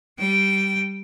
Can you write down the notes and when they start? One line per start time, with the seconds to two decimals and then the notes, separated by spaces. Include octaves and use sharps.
0.19 G3 G5